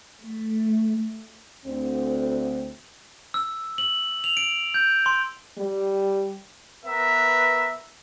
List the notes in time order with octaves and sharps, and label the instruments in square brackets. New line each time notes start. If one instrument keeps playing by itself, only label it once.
[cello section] A3
[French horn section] D2 C4
[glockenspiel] E6
F#7
F7
D7
G6
C6
[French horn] G3
[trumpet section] B3 A#4 B4 E5